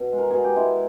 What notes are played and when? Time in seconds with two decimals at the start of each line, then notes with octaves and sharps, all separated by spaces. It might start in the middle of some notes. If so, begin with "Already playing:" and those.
Already playing: B2
0.12 G#3
0.18 A#4
0.30 B2 G#4
0.44 G4
0.56 G#3 E4